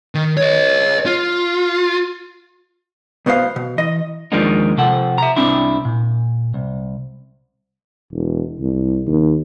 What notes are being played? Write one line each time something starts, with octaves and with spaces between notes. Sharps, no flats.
D#3
C#5 D#5
F4
C2 B2 B3 C5 F5
B2
E3 D#5
D#2 F3 G#3 A#3 D4 D#4
C3 F3 A4 F#5
E5 A#5
C2 C4 D4 E4
A#2
C2
E1
C2
D#2